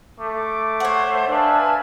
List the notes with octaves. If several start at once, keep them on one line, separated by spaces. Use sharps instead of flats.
A3 D6
C5 C#5 F#5
D4 B4 E5 F5 G#5 A5